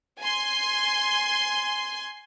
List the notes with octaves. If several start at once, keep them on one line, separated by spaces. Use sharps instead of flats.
G#5 C6